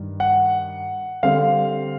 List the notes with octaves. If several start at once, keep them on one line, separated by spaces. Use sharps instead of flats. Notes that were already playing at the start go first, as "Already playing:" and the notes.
Already playing: G2 D#3
F#5
D3 G3 C4 F5